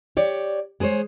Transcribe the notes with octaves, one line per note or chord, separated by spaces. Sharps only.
G4 C#5 D5
G#3 G#4 A4 C5 C#5